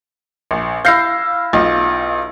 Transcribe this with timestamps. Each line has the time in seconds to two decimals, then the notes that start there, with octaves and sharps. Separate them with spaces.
0.51 A#1
0.85 E4 F5 G6 A#6 C7
1.53 B1 F4 D#5